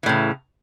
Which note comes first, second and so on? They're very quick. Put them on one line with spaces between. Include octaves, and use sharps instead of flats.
E3 A2 C#3